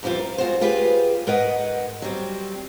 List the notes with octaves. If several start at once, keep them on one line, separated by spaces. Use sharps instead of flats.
F2 E3 F3 G3 F4
A#4
G#3 F4 F#4 C5
F4 G4 G#4 B4
G#2 A#4 B4 D#5 F#5
F#3 G3 C4